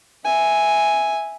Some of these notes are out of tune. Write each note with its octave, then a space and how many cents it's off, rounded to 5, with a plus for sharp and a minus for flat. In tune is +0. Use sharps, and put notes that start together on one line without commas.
E5 -5 G#5 +0